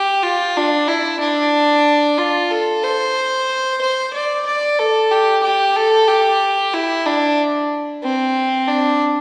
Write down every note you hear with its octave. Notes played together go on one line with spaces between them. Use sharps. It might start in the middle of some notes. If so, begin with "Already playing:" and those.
Already playing: G4
F4
D4
E4
D4
F4
A4
C5
C5
D5
D5
A4
G4
G4
A4
G4
E4
D4
C4
D4